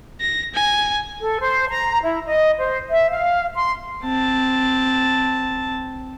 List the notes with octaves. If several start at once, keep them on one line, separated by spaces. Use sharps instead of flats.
A#6
G#5
A4
C5
A#5
E4
D#5
C5
E5
F5
C6
C4 A5